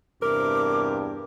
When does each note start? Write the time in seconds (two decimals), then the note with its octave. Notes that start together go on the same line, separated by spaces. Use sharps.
0.22 E2 G2 C3 A#4 D6